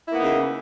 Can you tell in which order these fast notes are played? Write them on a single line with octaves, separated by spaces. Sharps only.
E4 A#3 B3 D#4 C#3